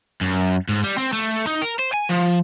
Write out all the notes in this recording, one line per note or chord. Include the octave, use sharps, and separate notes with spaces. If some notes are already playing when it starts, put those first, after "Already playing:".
F#2
G#2
G3
C4
A3
D#4
A#4
C5
G#5
F3